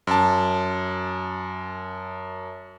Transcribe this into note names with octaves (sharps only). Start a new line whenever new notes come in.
F#2 A5